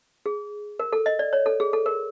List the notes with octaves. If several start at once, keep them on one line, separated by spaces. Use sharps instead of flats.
G#4
A#4
A4
D#5
D5
C#5
A4
G#4
A4
A#4